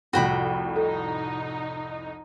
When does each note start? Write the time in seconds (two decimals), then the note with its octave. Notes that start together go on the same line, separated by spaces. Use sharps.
0.13 C2 F2 A2 F#4 G5 B5
0.76 D#4 A4